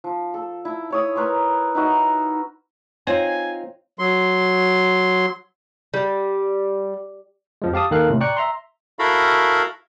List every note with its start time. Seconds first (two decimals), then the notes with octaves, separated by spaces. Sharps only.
0.04 F3
0.34 A4
0.65 E4
0.90 E4 C#5 D#6
1.16 A#4 B4 C#5 C6
1.75 D#4 E4 F#4 D#5
3.07 C4 D#4 F4 C#5 G#5
3.99 F#3 C6
5.94 G3
7.62 F2 F3 G#3
7.74 G4 F5 A5 D#6
7.91 D#2 D#3 A4 A#4 F5 F#6
8.09 A2 C3
8.21 D5 G5 A#5 C#6 F#6 C#7
8.37 E5 A#5 C6
8.99 E4 F#4 A4 A#4 F5 B5